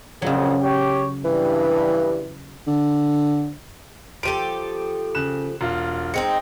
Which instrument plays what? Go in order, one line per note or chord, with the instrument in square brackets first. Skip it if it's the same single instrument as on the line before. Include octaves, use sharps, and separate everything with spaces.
[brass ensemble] A#1 F2 [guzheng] C#3 F#3
[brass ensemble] G4 C#5
[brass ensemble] G2 [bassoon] E3
[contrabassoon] D3
[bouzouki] F3 G4 A4 [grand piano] D7 D#7
[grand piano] C#3 F#6 E7
E1 F4
[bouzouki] G#3 C4 D#4 [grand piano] C#7